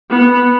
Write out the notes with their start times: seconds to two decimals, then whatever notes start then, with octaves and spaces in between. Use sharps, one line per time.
0.10 B3